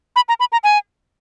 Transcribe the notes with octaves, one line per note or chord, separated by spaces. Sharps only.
B5
A#5
B5
A#5
G#5